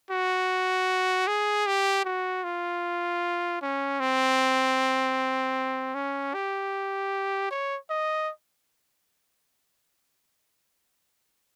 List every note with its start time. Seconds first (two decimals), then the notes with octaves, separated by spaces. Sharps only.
0.11 F#4
1.28 G#4
1.67 G4
2.05 F#4
2.44 F4
3.62 C#4
4.00 C4
5.95 C#4
6.34 G4
7.51 C#5
7.90 D#5